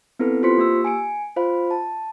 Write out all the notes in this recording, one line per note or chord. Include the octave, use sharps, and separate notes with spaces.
B3 C4 E4 A4 B4
F4 G4 C5 C6 B6 C#7
A#3 G4 E6
G#5 C#7 D7
F4 C5 F5 B5
A5